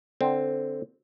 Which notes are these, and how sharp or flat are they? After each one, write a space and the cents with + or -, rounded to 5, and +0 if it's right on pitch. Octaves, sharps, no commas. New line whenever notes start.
D3 +0 C4 +0